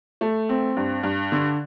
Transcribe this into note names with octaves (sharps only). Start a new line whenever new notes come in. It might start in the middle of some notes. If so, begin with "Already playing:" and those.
A3
C4
G2
G2
D3